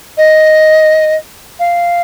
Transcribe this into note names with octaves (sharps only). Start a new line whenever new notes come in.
D#5
F5